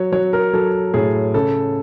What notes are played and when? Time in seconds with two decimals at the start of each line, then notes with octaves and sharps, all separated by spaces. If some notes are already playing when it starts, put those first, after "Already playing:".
Already playing: F#3 C#5
0.12 F#3 C#5
0.33 A#4
0.53 F#3 A4
0.94 A2 G#4
1.34 C#3 A4